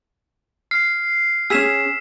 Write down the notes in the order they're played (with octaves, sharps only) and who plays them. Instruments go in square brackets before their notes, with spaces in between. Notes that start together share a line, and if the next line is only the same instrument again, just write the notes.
[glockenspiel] F6 [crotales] C7
[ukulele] C#4 G#4 [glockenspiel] E6 B6 E7